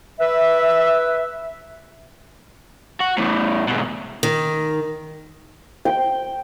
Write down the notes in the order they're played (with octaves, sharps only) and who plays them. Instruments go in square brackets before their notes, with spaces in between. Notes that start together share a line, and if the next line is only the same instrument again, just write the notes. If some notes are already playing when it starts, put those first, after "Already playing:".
[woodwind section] B4 E5
[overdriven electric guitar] F#4
E2 A2
G#2 B2
[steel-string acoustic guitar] D#3
[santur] G5